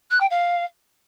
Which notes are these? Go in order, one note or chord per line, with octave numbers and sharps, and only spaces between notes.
F#6
G5
F5